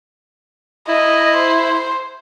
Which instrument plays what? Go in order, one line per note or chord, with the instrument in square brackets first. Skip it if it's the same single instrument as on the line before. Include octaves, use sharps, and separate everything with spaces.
[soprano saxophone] E4 [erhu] D#5
[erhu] C5